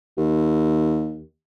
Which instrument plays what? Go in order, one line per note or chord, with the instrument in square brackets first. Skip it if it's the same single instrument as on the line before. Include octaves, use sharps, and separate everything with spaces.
[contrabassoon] D#2